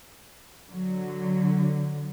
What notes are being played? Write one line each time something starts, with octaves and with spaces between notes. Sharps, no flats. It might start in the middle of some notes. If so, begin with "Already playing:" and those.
D3 F#3